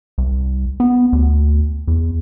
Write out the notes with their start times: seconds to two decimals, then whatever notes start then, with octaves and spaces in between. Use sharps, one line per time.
0.18 C2
0.80 B3
1.13 D2
1.88 E2